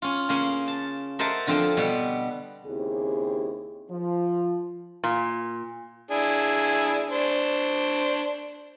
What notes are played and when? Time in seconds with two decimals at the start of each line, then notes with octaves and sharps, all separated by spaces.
0.02 C#4 F4
0.29 C#3 A#3 C#4
0.68 A5
1.19 A#4 C5 D#5 E5 F#5 A5
1.47 D3 F3 C4 A4 C6
1.77 B2 G3 B3
2.65 D#2 C#3 C4 E4 G4 G#4
3.90 F3
5.04 A#2
6.11 D4 E4 G#4
7.11 D4 C5